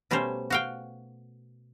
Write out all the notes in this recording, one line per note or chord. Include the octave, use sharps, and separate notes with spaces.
B2 G3 A3 C#4 C5
F#4 F5 G5